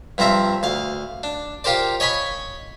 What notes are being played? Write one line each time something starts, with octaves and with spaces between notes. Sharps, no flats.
G2 F3 C4 E5 A#5
D2 F5
D4
F4 G4 A#4 C5 D5
C#5 D#5 G#5 B5 C#6